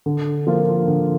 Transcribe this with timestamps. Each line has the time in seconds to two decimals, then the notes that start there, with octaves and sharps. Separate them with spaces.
0.06 D3
0.47 F3 A#3 F4
0.88 D3